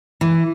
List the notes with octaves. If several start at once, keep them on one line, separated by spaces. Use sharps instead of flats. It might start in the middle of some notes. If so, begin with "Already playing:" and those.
E3